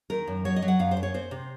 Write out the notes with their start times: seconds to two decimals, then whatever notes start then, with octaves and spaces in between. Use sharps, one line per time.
0.10 D#3 A#4
0.27 F#2
0.45 F#3 C#5
0.56 D#5
0.62 F#3
0.68 F#5
0.79 F#2 F5
0.91 C5
0.97 F#2
1.03 C#5
1.14 C4 C5
1.31 C3